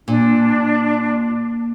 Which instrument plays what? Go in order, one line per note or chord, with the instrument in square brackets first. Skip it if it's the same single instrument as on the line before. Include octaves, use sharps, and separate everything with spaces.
[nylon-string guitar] A#2 [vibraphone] A#3 [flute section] D4